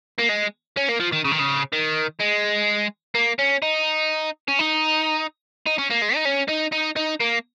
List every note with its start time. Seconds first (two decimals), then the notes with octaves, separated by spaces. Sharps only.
0.19 A#3
0.29 G#3
0.77 C#4
0.89 A#3
1.00 F3
1.12 D#3
1.25 C#3
1.31 D#3
1.39 C#3
1.73 D#3
2.20 G#3
3.15 A#3
3.39 C#4
3.62 D#4
4.48 C#4
4.59 D#4
5.66 D#4
5.78 C#4
5.90 A#3
6.01 G#3
6.15 D#4
6.25 C#4
6.49 D#4
6.72 D#4
6.96 D#4
7.20 A#3